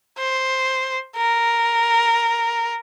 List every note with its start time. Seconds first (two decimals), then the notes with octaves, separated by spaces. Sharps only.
0.18 C5
1.17 A#4